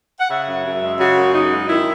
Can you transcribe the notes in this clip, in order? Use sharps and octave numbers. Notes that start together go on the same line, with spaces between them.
F#5
C#3 E5
F#2
F#2
G#3
C#3 F#4
F#2
F#2 D#4
G#3
D#3 E4